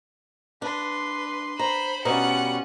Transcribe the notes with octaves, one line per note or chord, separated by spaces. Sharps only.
D4 B4 C6
C5 A#5 B5
B2 G3 C#4 F4 B4 F#5 A#5